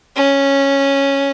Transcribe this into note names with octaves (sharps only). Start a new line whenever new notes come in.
C#4